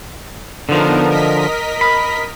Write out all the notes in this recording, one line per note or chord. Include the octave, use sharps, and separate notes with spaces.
D3 F3 B3 D#4 A#4
A#4 D#5 B6
B5